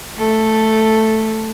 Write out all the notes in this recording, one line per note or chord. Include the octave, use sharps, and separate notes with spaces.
A3 A4